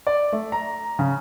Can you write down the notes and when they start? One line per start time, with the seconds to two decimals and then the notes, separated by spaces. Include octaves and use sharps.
0.07 D5
0.33 A3
0.52 A#5
0.99 C#3